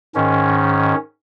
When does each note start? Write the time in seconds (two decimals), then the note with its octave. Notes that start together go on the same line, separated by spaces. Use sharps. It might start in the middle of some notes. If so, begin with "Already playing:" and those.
0.15 G#2 D#3 C#4